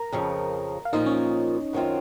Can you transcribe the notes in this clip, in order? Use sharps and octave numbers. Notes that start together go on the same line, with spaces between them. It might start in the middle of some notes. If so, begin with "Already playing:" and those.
Already playing: A#4 A#5
F2 C#3 F3
F5
A#2 F3 A#3 D#4 F4 D#5
C#4 C#5
F#2 D#3 F#3 C4 F4